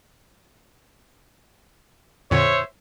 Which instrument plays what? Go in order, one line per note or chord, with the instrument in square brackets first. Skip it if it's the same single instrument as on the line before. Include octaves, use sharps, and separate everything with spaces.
[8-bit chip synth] F2 A#2 D3 [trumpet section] C5 C#5 E5